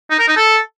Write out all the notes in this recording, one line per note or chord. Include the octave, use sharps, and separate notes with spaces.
D#4
A#4
D#4
A4